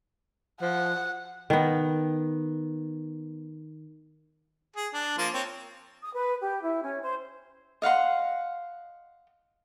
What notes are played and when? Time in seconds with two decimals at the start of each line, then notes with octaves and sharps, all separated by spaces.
0.62 F3 F#5
1.50 D#3 B3
4.76 G#4
4.94 D4
5.18 F3 A#3 F4
5.34 C4 C#5
6.02 D#6
6.15 B4
6.42 G4
6.62 E4
6.82 C#4
7.01 C5
7.82 D#5 F5 F#5 C6